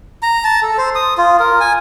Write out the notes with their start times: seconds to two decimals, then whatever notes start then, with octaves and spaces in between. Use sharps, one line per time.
0.23 A#5
0.44 A5
0.63 A4
0.78 C5
0.95 D#6
1.18 F4
1.40 A#4
1.60 G#5